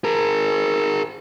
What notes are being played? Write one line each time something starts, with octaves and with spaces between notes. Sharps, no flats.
G#4 A#4